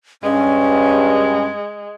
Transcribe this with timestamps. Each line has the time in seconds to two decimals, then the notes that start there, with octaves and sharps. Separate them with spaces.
0.23 G2 G#3 C#4